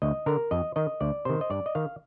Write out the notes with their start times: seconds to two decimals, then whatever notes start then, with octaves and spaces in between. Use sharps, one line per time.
0.02 D2 D#5
0.26 D3 A#4
0.51 F2 D#5
0.76 D#3 D#5
1.01 D2 D5
1.25 C3 D#3 C5
1.41 D#5
1.50 G2 D5
1.66 D#5
1.75 D#3 F5